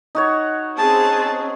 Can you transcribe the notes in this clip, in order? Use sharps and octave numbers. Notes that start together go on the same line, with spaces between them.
D#4 F#4 C#5
C4 C#4 G#4 A5